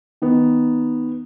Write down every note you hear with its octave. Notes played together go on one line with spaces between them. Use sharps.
D#3 B3